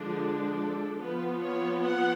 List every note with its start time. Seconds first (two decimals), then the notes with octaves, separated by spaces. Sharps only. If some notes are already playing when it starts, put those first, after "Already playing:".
Already playing: D3 F3 G#3 D4
0.58 A4
0.99 F3 B3 F4 B4
1.41 C#5
1.83 F#5